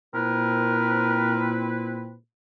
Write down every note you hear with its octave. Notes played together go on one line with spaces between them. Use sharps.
A#2 C4 E4 A#4 B4